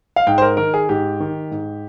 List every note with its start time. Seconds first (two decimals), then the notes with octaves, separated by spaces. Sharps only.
0.16 F5
0.27 G#2 G5
0.38 C5
0.42 A#4
0.57 D#3 A#4
0.74 G#4
0.89 G#2 G4
1.20 D#3
1.51 G#2